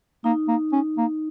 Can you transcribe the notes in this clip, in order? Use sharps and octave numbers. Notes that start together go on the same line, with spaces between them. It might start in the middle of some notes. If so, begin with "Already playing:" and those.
A#3 D#4
A#3
C#4
A#3